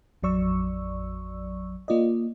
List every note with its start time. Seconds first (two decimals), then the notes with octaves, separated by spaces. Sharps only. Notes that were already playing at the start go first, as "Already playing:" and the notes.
0.23 A1 F2 F#3 D5 C#6 E6
1.88 A#3 F4 D5 D#5